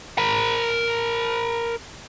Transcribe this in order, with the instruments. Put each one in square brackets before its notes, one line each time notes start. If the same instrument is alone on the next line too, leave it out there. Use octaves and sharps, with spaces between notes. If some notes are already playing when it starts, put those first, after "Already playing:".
[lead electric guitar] A#4 B5